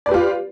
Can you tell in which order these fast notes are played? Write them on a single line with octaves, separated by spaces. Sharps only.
D5 B4 G4 F4